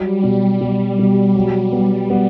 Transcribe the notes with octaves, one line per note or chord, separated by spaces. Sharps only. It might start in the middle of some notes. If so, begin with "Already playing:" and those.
Already playing: F#3 G3
B2
B2 G3
B2
F#3 G3
B3
B3